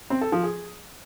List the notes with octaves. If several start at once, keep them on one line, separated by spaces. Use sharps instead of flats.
C4
A4
F3
G#4